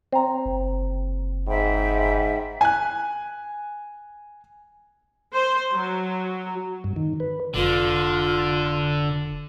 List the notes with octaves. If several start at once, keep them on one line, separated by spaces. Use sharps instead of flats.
C4 A#5
F#1
G#2 E5 G5 B5
G#5 F#6
C5
F#3
G2
D#3
B4
F1 D3 F4